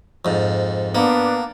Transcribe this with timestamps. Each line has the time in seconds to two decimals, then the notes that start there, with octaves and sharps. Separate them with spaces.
0.25 F2 G#2
0.95 A#3 B3 D4